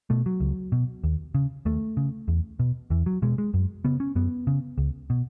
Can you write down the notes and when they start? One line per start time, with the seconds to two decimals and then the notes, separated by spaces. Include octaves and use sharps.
0.10 B2 A3
0.26 F#3
0.40 C#2
0.72 B2
1.04 D#2
1.35 C#3
1.65 D#2 A3
1.97 C#3
2.28 E2
2.59 B2
2.90 E2 E3
3.06 F#3
3.22 B2 G#3
3.38 G#3
3.54 F#2
3.85 C#3 B3
4.00 C#4
4.16 F#2 B3
4.47 C#3
4.78 C#2
5.10 B2